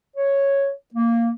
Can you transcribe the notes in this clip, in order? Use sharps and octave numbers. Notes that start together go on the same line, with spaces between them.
C#5
A#3